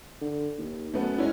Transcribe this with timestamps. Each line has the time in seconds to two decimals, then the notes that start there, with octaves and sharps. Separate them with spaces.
0.21 D3
0.58 D#2
0.94 F#2 A3 B3
1.18 G#3 C#4 E4